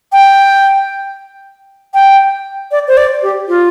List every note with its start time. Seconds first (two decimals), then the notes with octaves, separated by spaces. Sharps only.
0.12 G5
1.94 G5
2.71 D5
2.87 C5
2.97 D5
3.22 G4
3.48 F4